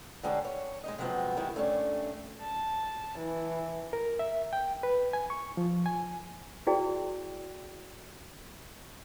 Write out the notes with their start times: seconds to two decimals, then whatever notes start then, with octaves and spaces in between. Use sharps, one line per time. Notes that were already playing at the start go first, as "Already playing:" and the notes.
0.23 D3 G3 G#3 D4 G#4 C#5
0.45 C#5
0.84 G#3 D#4 D#5
0.98 C3 F3 F#3 G#3 B3 C4
1.37 D#3 G3 G#3 E4
1.55 G2 A3 C#4 D4
2.42 A5
3.18 E3
3.93 A#4
4.19 E5
4.53 G5
4.83 B4
5.13 G#5
5.30 C#6
5.57 F3
5.86 G#5
6.67 E4 F#4 G#4 D5 G5